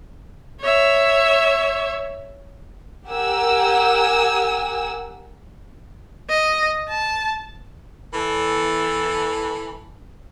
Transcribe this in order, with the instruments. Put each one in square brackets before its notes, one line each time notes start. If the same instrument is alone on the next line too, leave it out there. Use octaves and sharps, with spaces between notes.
[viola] C#5 E5
[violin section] G4 A#4 F#5 G#5 E6
[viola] D#5
A5
[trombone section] E2 A4 [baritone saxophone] E3